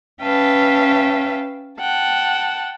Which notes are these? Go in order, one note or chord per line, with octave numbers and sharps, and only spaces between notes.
C#4 B4 E5 F5 G5 A5
F#5 G5 A5